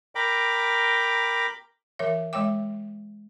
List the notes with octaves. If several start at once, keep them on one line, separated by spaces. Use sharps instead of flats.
A#4 G5 A#5 B5 D6
E3 A#4 C#5 E5
G#3 C#5 E5 G5 D6